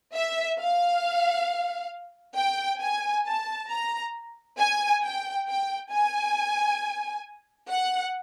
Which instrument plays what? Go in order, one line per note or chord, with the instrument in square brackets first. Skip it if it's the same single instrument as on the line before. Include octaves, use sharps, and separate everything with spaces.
[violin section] E5
F5
G5
G#5
A5
A#5
G#5
G5
G5
G#5
F#5